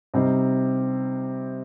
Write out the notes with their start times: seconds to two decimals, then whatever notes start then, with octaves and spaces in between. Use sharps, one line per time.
0.14 C3 G3 C4 D#4